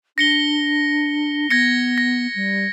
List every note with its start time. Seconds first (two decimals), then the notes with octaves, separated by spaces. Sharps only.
0.18 D4 A#6 C#7 G7
1.50 B3 G#6 A#6 C#7
1.98 A#6
2.36 G3